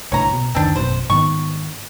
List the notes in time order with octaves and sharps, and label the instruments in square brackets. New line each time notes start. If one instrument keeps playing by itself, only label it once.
[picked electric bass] C2 A2 D3 [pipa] C#5 A#5
[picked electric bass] B2
[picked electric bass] F#1 D2 D#3 [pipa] C4 D4
[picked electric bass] A1 F#2 B2 [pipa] C5
[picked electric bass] G#2 D#3 B3 [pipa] C#6